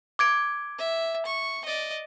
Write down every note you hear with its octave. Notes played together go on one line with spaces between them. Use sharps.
D6 G#6 D7
E5
C#6
D5 D#5